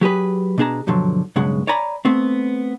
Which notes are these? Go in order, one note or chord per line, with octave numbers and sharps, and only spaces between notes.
F#3 G4 G#4 B4
B2 B3 D4 G#4 A5 A#5
G2 B2 D3 F3 F#3
B1 G2 C#3 G#3 F#5
C#5 D5 G#5 A#5 B5
A3 B3 C4